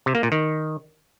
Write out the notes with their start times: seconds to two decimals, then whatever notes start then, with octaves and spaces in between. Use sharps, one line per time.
0.06 C3
0.15 A#3
0.23 A#2
0.32 D#3